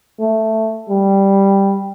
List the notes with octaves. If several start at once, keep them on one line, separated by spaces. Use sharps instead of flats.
A3
G3